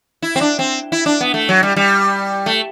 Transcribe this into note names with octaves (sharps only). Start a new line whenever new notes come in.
E4
C4
D4
C4
E4
D4
B3
A3
F#3
G3
G3
A3